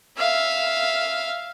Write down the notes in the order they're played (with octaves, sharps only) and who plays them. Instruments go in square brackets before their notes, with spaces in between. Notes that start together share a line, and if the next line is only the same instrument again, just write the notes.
[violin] E5 F5